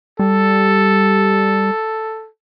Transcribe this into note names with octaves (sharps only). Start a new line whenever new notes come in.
G3 A4